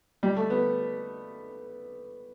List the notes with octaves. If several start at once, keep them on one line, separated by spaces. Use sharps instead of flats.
G3
A3
B3